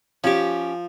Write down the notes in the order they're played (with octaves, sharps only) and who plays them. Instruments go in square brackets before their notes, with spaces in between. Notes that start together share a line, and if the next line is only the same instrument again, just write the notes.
[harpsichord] F3 [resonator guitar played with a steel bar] C#4 G4